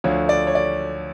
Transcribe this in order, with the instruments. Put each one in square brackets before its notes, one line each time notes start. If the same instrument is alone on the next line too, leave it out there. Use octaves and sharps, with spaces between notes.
[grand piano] D2 D3 F3 C#5
D5
C#5
D5